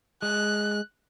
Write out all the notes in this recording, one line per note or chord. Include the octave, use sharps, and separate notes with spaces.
G#3 F#6